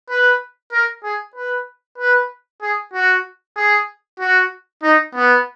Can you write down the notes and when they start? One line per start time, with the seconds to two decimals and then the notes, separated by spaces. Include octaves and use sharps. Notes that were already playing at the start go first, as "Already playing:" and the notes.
0.09 B4
0.72 A#4
1.04 G#4
1.35 B4
1.98 B4
2.62 G#4
2.93 F#4
3.56 G#4
4.20 F#4
4.83 D#4
5.15 B3